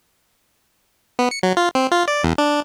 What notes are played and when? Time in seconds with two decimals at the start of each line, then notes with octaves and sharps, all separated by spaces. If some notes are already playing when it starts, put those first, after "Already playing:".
1.19 B3
1.31 C#7
1.43 F#3
1.57 F4
1.75 C4
1.92 F4
2.08 D5
2.24 E2
2.38 D4